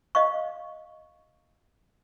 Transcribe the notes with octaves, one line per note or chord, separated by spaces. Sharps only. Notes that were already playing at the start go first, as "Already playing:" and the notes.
D#5 F5 C#6